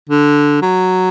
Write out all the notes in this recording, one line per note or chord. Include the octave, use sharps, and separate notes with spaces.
D3
F#3